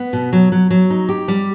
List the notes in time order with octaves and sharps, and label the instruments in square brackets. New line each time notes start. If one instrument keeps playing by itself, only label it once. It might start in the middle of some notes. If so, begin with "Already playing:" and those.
Already playing: [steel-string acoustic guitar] B3
B2
F#3
F#3
F#3
D#4
G4
G3